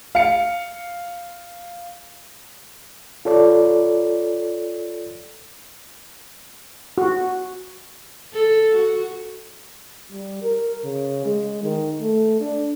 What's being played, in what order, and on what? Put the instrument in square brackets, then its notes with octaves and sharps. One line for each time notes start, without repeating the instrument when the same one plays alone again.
[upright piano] F5 C#7
[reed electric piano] F4 A4 C#5 D5
[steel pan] F#4
[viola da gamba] A4
F#4
[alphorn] G3
A#4
C#3
G#3
D#3
A3
D4